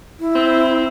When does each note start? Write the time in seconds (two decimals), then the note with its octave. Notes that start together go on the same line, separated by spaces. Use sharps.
0.20 E4
0.35 C4